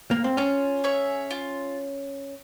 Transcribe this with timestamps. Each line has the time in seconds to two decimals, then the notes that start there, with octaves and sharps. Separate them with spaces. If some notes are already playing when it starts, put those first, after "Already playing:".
0.11 A#3
0.24 C4
0.37 C#4 F4
0.84 G#4 C#5 E5
1.31 F4